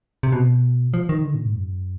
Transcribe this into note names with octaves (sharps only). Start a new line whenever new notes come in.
C3
B2
F3
D#3
D3
A#2
G#2
F#2